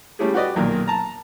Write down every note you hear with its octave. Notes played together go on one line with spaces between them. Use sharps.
G3 A3 C#4 E4 G4 G#4
F#4 G4 B4 D5 D#5
B1 A#2 D#3 A#4
A5 A#5